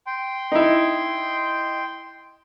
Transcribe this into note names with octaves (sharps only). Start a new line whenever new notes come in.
G5 C6
D#4 E4